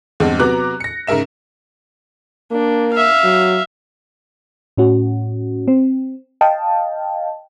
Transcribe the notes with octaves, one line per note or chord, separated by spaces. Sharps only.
E2 G2 G#3 C4
C3 F#3 B3 A#5 D6 F#6
A#6 C#7
G#2 C#3 A#4 E5 E7
A#3 D4
E5 F5
F#3
A2 C#4 F#4
C4
D#5 F5 G5 A5